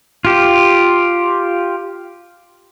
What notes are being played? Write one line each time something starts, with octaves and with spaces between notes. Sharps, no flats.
F4 G4